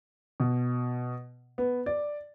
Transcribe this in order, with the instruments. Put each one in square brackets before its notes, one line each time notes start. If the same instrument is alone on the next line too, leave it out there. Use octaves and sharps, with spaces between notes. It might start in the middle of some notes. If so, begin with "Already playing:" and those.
[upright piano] B2
B3
D5